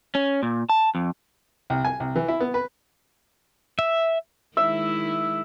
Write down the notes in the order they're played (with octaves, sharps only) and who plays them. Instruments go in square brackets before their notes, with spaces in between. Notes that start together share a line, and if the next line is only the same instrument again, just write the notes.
[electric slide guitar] C#4
A#2
A5
F2
[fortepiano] C2
G#5
C2
E3
E4
B3
B4
[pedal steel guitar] E5
[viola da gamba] D#3 G#3 E4 [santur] E5